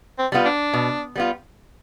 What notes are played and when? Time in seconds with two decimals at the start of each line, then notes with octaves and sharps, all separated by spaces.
0.19 C4
0.32 G3 B3 F4
0.45 D4
0.74 B2
1.16 G3 B3 F4